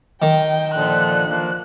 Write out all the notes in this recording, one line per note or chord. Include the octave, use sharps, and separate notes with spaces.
D#3 G5
A#2 D3 F3 F#6
F3 A#3